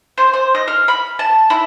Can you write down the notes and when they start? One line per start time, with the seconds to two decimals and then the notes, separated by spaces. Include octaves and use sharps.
0.18 C5
0.33 C5
0.55 D#5
0.68 F5
0.88 B5
1.19 A5
1.50 E4